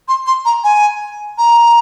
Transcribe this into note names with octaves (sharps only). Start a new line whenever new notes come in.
C6
C6
A#5
G#5
A#5